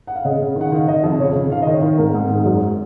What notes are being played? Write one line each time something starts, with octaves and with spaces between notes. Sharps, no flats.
F#5
F5
C#3 D#5
C#3
D#3 F#5
D#3 F5
D#3 D#5
F2
C#3 C#5
C#3
D#3 F5
D#5
D#3
C#5
D#3
G#2 A#4
G#2 G#4
G#2
F#2